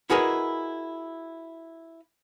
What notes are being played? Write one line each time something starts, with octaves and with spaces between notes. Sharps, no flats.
E4 F#4 G#4 A#4 B4 D#5